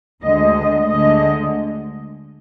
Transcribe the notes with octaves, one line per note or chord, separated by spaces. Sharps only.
D2 D3 G#3 D#5
D2 D3 G#3 D#5